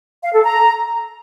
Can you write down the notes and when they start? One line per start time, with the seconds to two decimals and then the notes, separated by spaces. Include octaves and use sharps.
0.23 F5
0.33 A4
0.43 A#5